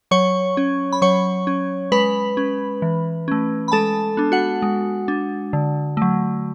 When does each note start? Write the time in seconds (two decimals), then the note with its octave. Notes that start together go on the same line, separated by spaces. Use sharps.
0.11 F#3 C#5 C#6
0.57 C#4
0.92 B5
1.02 F#3 C#5 C#6
1.47 C#4
1.92 G#3 B4 B5
2.37 C#4
2.82 E3
3.28 A3 C#4
3.68 B5
3.72 G#3 A4 A5
4.17 B3 D4
4.32 F#4 F#5
4.62 G#3
5.08 D4
5.53 D3
5.97 F#3 A3